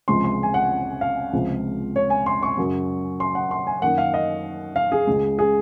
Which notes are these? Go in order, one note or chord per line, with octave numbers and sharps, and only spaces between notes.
C#2 C3 F3 G#3 C6
C6
G#5
F#5
F5
C#2 C3 F3 G#3
C#5
G#5
C6
C#6
F#2 C#3 F#3
C6
F#5
C6
G#5
F#2 D#3 A#3 F#5
F5
D#5
F5
G#4
C#2 C#3 G#3
G#4